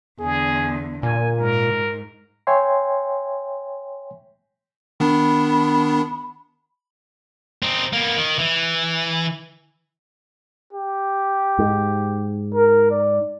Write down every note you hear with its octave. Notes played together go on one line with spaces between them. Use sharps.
E2 D3 G#4
A#2 G#5
G#2 A#4
C#5 E5 G5 G#5 C6
D#3 B3 D4 B5
C4 D#4
A#3 B3
D#3
E3
G4
G#2
A#4
D5